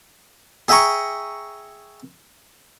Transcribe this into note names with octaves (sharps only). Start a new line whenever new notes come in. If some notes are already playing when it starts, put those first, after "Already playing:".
G#4 E5 G5 G#5 A#5 C#6